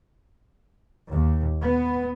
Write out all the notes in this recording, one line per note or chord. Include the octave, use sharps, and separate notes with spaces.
D#2
B3